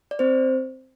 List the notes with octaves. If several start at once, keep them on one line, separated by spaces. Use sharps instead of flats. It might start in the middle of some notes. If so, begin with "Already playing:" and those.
D5
C4 C5